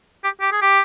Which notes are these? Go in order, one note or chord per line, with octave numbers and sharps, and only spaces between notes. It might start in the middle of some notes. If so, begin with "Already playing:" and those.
G4
G4
G#4
G4